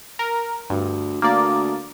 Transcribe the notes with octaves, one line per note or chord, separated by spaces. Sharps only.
A#4
D2 G2
D2 A#3 D5